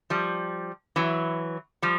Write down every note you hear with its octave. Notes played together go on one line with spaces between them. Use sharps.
F3 G3
E3 F#3
F3 G3